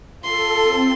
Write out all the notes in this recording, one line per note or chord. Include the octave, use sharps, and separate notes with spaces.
F4 A4 C6
C4